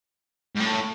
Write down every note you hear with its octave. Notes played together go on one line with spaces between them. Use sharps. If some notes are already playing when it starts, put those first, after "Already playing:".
G#2
A2